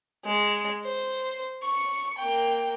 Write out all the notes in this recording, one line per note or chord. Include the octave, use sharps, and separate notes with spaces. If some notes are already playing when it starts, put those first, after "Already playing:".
G#3
C5
C#6
A#3 G5